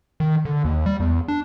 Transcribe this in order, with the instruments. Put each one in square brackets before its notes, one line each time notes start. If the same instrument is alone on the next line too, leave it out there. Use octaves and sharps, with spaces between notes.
[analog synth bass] D#3
D3
D#2
G3
E2
D4